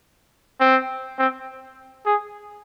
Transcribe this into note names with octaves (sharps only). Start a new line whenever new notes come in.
C4
C4
G#4